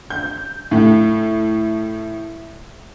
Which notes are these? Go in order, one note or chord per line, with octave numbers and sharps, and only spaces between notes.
G6
A2